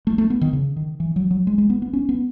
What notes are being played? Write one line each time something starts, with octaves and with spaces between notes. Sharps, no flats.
A3
A3
B3
D#3
C#3
D#3
E3
F#3
F#3
G#3
G#3
B3
B3
C#4
B3